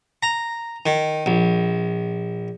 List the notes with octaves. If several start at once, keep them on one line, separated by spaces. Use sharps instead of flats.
A#5
D#3
A#1